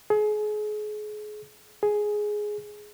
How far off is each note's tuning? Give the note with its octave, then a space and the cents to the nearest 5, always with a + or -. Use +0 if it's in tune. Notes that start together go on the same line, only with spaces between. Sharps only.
G#4 +30
G#4 +5